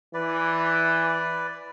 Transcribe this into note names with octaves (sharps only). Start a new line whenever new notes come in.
E3 B4 D5